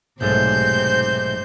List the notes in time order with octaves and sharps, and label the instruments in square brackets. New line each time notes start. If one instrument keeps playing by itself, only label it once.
[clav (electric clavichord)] B1 G#2 A3 [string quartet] C3 C5 G6